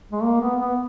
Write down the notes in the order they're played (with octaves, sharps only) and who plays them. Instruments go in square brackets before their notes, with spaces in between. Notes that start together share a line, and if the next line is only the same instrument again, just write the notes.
[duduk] G#3
A#3
B3
B3